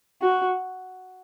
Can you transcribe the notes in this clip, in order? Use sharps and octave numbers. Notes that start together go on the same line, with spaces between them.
F#4